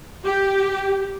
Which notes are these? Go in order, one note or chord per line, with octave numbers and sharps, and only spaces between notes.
G4